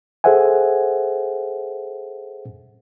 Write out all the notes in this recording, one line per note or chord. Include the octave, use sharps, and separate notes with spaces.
G#4 A4 C5 E5 F#5 G#5